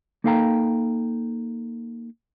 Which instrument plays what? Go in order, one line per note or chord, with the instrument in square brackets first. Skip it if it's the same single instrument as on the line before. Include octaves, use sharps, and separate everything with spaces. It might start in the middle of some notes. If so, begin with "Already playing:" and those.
[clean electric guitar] A#3 D#4 A4 F5 G5 A#5